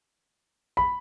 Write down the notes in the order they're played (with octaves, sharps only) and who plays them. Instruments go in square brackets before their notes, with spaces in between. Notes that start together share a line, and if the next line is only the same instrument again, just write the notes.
[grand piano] B5